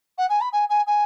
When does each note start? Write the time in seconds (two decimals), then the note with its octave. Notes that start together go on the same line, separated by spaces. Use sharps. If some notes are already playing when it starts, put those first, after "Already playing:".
0.18 F#5
0.29 G#5
0.41 B5
0.52 G#5
0.69 G#5
0.87 G#5